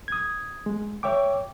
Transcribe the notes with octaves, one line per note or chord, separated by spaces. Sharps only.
D#6 G#6
G#3
C#5 E5 G5 D6